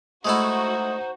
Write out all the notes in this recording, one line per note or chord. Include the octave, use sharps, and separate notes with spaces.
G#3 A3 D#4 E4 F#4 C5